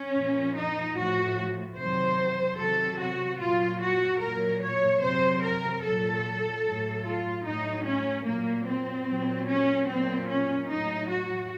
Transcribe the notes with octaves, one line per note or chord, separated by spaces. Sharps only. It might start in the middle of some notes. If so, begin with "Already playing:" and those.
Already playing: C#4
A#2 F3
D#4
A2 F3 F#4
C3 D#3 F#3 C5
C3 D#3 F#3 A4
F#4
A#2 F#3 F4
F#4
A#2 F#3 A#4
C#5
C3 F#3 C5
A#4
A#2 F#3 A4
A2 F#3
F4
A2 F#3 D#4
C#4
A#2 F#3 A#3
C4
A#2 F#3
C#4
A#2 F#3 C4
C#4
A2 F#3 D#4
F#4